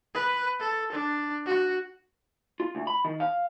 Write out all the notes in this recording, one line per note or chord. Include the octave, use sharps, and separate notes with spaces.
B4
A4
D4
F#4
F4
D2
B5
D#3
F5